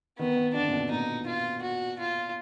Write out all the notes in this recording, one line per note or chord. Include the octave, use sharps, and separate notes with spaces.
D#3 B3
D#3
D3 D4
A#2
B2
A#2 D#4
F4
F#4
F4